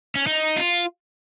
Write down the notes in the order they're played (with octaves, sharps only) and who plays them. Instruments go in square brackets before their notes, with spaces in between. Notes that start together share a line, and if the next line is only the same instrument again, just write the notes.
[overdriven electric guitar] C#4
D#4
F4